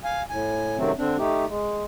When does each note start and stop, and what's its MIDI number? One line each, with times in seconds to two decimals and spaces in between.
0.04 0.22 77
0.04 0.22 80
0.30 0.77 45
0.30 0.77 80
0.77 0.92 42
0.77 0.92 48
0.77 0.92 51
0.77 0.92 54
0.77 0.92 57
0.77 0.92 60
0.98 1.17 50
0.98 1.17 60
0.98 1.17 62
1.18 1.45 57
1.18 1.45 63
1.18 1.45 67
1.48 1.85 56